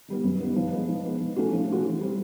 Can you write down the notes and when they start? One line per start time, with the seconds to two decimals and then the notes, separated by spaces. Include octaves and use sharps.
0.08 D#3 G3 B3
0.24 F#2
0.40 D#3 G3 B3
0.56 F3
0.72 G#3 B3
0.89 F3
1.05 G#3 B3
1.21 F3
1.36 A3 C#4 F#4
1.53 F3
1.69 A3 C#4 F#4
1.85 E3
2.01 G3 C4